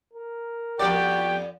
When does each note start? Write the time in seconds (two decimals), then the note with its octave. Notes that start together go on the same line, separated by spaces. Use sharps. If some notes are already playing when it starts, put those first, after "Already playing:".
0.13 A#4
0.79 F2 B3 F#4 G4 D5 G5